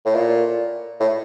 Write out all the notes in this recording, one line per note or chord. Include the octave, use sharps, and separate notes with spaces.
A2
A#2
A2